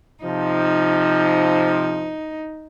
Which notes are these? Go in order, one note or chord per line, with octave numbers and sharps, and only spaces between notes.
C3 F3 D#4